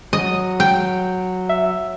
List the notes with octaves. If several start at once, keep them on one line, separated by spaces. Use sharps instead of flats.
F#3 D#5
G5
E5